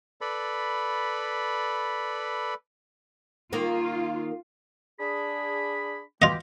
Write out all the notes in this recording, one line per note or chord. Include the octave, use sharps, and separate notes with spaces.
A4 B4 D5 B5
D#3 A#3 F4 A#4
D4 G#4 B5
B2 G#3 F4 G4 D#5